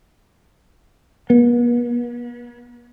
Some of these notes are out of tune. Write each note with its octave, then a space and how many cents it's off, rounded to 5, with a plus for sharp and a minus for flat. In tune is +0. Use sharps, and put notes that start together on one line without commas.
B3 -45